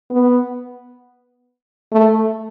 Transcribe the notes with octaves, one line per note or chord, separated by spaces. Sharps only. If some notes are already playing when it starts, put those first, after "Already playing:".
B3
A3